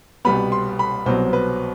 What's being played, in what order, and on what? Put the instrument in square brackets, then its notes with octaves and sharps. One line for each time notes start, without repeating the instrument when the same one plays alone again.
[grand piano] C2 B2 G3 B3 B5
C6
B5
C2 B2 F#3 B3 C5
B4